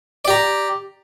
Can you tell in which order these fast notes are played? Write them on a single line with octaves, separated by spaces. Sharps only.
D5 G4 A#5